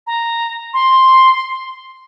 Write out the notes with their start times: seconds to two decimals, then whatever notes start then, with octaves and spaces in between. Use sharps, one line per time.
0.07 A#5
0.74 C6